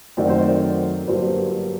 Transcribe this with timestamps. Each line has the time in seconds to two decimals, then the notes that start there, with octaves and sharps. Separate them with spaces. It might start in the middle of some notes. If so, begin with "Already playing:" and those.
0.17 F#2 D#3 F#3 A3 C4 D5
0.29 C5
0.41 D5
1.07 G1 G2 F#3 A#3 C5